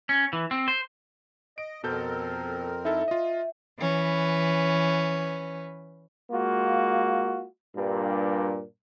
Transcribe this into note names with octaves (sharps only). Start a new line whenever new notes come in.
C#4
E3
C4
C5
D#5 D7
F2 B2 C4 A4 A#4 G6
D#4 E4 A4 E5
F4 D#5
E3 C#4 B4
G#3 A#3 F4 F#4
G2 A#2